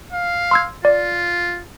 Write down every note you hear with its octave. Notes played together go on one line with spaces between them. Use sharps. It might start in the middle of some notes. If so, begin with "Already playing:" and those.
F5
C6 E6 G#6
F4 D5